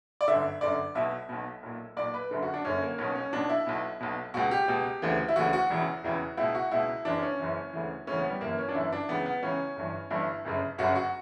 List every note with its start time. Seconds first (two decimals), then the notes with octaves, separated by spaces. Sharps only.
0.21 D5
0.28 G1 F#2 D3 E5
0.61 G1 F#2 D3 D5
0.95 B1 B2 E5
1.29 B1 B2
1.63 B1 A#2
1.97 B1 A#2 D5
2.14 B4
2.31 F#1 F#2 D3
2.42 F#4
2.54 D4
2.65 F#1 F#2 D3 C#4
2.82 A#3
2.98 B1 B2 C#4
3.15 C#4
3.33 B1 B2 D4
3.50 E4
3.67 B1 B2
4.00 B1 B2
4.34 C#2 B2 F#4
4.51 G4
4.68 C#2 B2
5.02 D2 C#3 E3
5.28 E4
5.36 D2 C#3 E3 F#4
5.53 F#4
5.70 E1 E2 C#3 E3
6.04 E1 E2 C#3 E3
6.37 C#2 B2 E4
6.55 F#4
6.71 C#2 B2 E4
7.05 F#1 F#2 E3 D4
7.23 C#4
7.39 F#1 F#2 E3
7.73 D2 C#3 E3
8.07 D2 C#3 E3 C#4
8.19 B3
8.30 G3
8.41 G1 F#2 E3 A#3
8.58 C#4
8.69 D4
8.75 G1 F#2 E3 E4
8.92 D4
9.09 C#2 C#3 E3 B3
9.26 B3
9.43 C#2 C#3 E3 C#4
9.77 G1 G2 E3
10.10 G1 G2 E3 E4
10.45 G1 F#2 C#3
10.78 G1 F#2 C#3 F#4
10.95 F#4